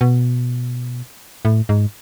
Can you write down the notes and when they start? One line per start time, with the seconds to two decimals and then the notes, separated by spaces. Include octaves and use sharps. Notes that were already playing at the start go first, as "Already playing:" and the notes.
0.01 B2
1.45 A2
1.69 G#2